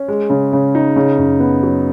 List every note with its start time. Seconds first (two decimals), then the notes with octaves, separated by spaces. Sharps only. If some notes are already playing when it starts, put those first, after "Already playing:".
Already playing: C#4
0.08 G#3
0.30 C#3
0.53 C#3
0.75 D#4
0.96 C#3
1.18 F#2
1.40 B3
1.63 F#3